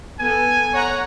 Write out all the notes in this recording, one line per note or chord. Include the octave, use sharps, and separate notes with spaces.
B3 A4 G#5
C#5 F#5 A#5